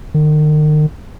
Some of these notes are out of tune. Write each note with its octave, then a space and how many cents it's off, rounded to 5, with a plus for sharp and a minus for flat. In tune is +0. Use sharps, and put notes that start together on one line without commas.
D#3 -40